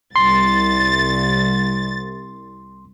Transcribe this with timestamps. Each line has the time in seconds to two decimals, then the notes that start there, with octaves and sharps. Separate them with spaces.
0.16 C2 C6 A6